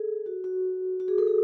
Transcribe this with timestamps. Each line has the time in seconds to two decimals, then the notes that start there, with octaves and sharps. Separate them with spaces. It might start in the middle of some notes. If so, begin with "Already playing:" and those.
Already playing: G#4 A4
0.26 F#4
0.44 F#4
1.00 F#4
1.08 G#4
1.18 A4
1.27 G#4